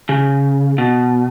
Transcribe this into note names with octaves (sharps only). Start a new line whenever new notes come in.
C#3
B2